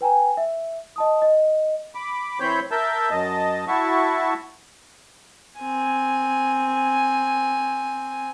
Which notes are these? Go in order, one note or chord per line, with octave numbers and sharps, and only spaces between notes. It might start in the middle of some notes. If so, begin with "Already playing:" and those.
B4 G5 G#5 A#5
E5
D#5 A5 D#6
D#5
B5 D6
E3 C4 C5 C#5 B5 G6
A#4 E5 A5 E6 G6
F#2 D#5 A5
E4 F#4 E5 A5 C#6
C4 G#5